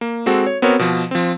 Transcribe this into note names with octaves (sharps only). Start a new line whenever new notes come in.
A#3
G#3 C4 F#4 A4
C#5
B3 C4 F#4 A#4 C#5
B2 F3
F3 C4